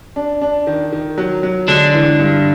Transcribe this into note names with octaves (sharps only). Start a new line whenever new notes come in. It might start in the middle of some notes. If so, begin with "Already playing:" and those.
D4
D4
D#3
D#3
F#3
F#3
D3 G#3 D4
E3
G2